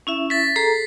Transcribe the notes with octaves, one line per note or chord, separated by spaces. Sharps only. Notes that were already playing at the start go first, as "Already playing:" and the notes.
C#4 E4 E5
A6 B6
G#4 A4 A#5 C7